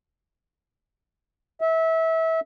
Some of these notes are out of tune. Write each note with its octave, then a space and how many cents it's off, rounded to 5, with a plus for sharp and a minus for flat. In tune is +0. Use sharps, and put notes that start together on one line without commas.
E5 -25